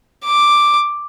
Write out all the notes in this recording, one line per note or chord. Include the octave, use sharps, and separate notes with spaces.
D6